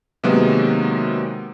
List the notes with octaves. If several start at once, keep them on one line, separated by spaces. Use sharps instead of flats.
C3 D#3 F#3 G#3 A#3 B3